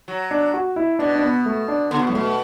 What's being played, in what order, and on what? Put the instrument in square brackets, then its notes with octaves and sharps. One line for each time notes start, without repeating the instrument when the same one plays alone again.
[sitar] F#3
[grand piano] D4
F#4
E4
[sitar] B2 [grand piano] D4
[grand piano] D4
B3
A3
D4
[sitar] D3 [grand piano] B3
[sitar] B2
[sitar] A2 [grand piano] F#3
[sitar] B2 [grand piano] A3